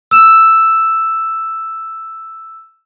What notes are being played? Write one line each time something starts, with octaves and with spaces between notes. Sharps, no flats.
E6 E7